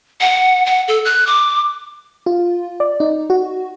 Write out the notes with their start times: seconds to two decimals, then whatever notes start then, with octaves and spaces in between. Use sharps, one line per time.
0.21 F#5
0.66 F#5
0.88 A4
1.05 F#6
1.27 D6
2.26 F4
2.80 D5
3.00 D#4
3.30 F#4